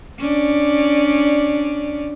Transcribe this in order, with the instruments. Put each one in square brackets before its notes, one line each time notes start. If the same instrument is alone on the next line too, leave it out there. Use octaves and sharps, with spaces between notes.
[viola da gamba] C#4 D4 D5